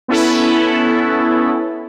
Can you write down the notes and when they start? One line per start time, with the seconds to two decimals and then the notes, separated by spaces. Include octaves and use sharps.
0.08 B3 C#4 E4 A4